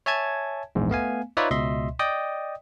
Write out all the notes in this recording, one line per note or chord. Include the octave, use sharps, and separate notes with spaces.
C#5 E5 G#5 A5 G#6
A#1 E2 G#2
A3 B3 F5 G#5
D#4 F4 B4 C#5 D5 E5
C#2 B2 D#5 E5 C6
D5 D#5 G5 D#6